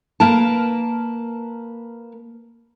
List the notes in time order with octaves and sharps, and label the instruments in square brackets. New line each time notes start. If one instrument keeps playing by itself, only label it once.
[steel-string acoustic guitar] A#3 A#4 B4 A5